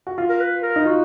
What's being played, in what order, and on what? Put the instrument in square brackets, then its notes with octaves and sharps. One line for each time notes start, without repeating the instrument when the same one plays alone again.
[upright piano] F#4
F4
[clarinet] A#4
B4
A#4
[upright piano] D#4
[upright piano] F4 [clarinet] F#4